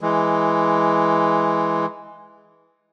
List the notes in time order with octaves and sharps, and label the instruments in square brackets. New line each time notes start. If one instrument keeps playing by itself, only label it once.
[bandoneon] E3 G#3